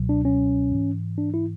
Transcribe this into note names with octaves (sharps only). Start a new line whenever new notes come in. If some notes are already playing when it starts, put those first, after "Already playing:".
Already playing: C#2 B2 F#3
D4
C#4
G#2 E3
D4
E4